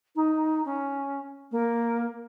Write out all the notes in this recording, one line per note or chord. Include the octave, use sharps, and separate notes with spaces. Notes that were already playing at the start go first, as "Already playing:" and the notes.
D#4
C#4
A#3